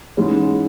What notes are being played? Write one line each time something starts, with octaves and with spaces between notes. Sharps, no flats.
G#2 E3 G#3 C#4